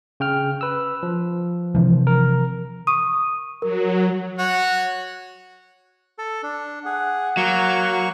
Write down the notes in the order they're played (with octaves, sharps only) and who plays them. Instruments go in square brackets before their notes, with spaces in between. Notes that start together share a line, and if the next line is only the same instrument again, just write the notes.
[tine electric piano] C#3 G5 F6
B4 E6
F3
[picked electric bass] C3 E3 F3
[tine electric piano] A#4
[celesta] C#6 D#6 D#7
[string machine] F#3 [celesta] A#4
[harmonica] F#4 C#5 F#5
[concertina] A4
D4
[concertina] G#4 [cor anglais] F#5
[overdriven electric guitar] F#3 [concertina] A#3 C#6